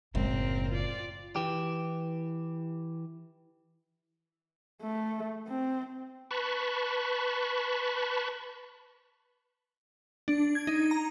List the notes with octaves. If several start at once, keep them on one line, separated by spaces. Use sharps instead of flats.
F#1 A2 G#3 C4 A#4
F4 D5
E3 G4
A3
C4
B4 A5 B5 C#6
D4
G#6
D#4
A#5